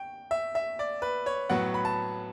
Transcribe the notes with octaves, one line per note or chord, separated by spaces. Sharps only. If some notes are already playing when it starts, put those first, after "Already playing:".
Already playing: G5
E5
E5
D5
B4
C#5
A2 F#3 B3 F#5
B5
A5